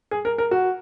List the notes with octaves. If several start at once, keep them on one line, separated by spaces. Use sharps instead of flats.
G#4
A#4
A#4
F#4